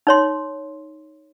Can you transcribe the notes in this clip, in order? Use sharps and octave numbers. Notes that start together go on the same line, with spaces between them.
D#4 C#5 C6